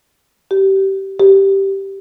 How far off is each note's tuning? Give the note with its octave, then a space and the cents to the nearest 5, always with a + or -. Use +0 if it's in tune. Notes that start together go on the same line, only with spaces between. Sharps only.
G4 -20
G4 -10